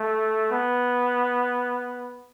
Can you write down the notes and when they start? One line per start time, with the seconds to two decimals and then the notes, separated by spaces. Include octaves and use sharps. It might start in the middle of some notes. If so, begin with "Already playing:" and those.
Already playing: A3
0.52 B3